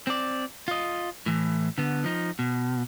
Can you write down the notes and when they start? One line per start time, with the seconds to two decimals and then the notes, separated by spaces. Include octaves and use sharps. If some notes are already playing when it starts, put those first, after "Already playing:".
0.07 C4 D5
0.68 F4 D#5
1.26 A2 E3
1.78 D3 B3
2.04 F3 D#4
2.39 B2